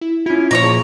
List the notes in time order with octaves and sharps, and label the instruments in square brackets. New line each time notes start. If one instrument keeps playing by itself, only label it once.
[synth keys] E4
[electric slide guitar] C#4 E4 [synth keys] F4
[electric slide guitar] A#2 F3 [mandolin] C#5 D5 A#5
[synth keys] G#4 A5